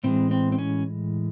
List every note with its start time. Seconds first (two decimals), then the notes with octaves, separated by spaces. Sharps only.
0.04 A2 E3 G#3 C4
0.31 C4
0.52 C4
0.59 C#4